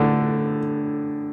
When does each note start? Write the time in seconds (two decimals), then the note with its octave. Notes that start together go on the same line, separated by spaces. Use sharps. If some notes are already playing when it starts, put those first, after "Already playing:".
Already playing: A2 D3